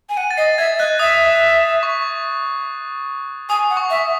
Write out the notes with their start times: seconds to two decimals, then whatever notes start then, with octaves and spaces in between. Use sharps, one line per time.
0.09 G#5
0.17 F#5 D#7
0.31 A6
0.37 D#5 C7
0.58 E5 G#6
0.79 D#5 F#6
0.99 E5 D#6
1.83 C#6
3.49 G#5 D#6
3.70 F#5
3.77 C#6
3.90 E5